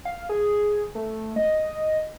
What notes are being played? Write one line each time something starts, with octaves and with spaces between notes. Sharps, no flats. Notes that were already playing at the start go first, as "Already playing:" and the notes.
F5
G#4
A3
D#5